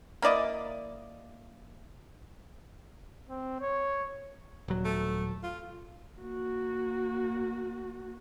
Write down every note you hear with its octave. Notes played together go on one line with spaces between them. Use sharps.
A#3 E4 D5 D#5
C4
C#5
D#1 F#3
A3
F4
A#3 F#4